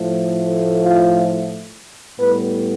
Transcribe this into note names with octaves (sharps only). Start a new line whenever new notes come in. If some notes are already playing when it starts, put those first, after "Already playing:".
Already playing: A2 F3 A3
F4
A2 G3 B3 B4